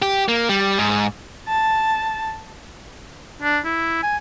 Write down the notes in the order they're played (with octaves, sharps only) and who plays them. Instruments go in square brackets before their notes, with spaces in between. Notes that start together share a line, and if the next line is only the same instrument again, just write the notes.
[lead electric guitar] G4
A#3
G3
G#2
[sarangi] A5
[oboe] D4
E4
G#5